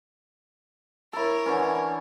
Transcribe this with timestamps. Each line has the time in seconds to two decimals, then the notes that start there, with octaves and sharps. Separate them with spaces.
1.13 E4 A4 A#4 C#5
1.46 D3 E3 C#4